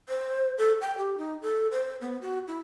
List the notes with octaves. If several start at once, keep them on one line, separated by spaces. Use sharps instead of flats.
C5
A4
G5
G4
D#4
A4
C5
B3
F#4
E4